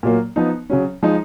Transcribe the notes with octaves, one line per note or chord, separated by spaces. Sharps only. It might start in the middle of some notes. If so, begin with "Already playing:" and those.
A#2 F#3 A#3
F3 B3 D#4
C#3 F#3 C#4
F3 G#3 D#4